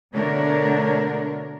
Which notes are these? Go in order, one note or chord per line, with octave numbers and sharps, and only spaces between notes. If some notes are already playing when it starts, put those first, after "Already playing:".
B2 D3 A3 D4 A#4 C#5